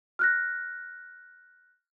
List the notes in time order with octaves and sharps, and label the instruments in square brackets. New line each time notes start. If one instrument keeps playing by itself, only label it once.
[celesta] F6 F#6 A#6